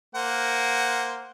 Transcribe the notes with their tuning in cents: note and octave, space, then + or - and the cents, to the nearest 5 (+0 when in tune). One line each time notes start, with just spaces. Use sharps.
A#3 +0 C5 +0 F#5 +0